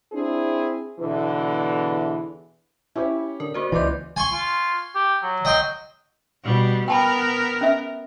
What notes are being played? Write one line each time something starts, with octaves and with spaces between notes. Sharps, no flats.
C4 D4 E4 G#4
E2 B2 D3 E3
C#4 E4 G4 C#5
D3 A#4
A#3 F#4 C5 D5
C#2 E3 B4 D#5 C6 D6 G6
G#5 C6 C#6
F4
G4
F#3
D#5 G5 C6
B2 G3
B3 A#4 G5 A5 B5
C#4 E5